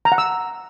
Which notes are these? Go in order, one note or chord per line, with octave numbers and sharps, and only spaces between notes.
A#5
F#5
E6